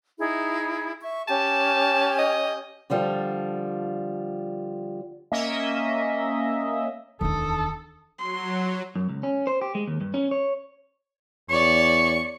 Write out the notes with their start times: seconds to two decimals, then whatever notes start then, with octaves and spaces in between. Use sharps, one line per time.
0.19 D#4 E4 G#4
1.01 E5 C#6
1.28 C#4 G4 G#5 A5
2.19 D#5
2.90 D3 F3 G3 F4 A4
5.32 A#3 C#4 D#5 E5
7.21 D1 E2 D#3 D4 A4 D#6
8.18 F#3 C6
8.96 F#2
9.09 C#2
9.23 C#4
9.47 C5
9.61 G4
9.75 G#3
9.87 D#2
10.01 G2
10.14 C#4
10.31 C#5
11.50 E2 C#5 D5 C#6